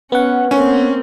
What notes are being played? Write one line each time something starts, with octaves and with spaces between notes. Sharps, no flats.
B3 C#4 F#5
A#3 C4 C#4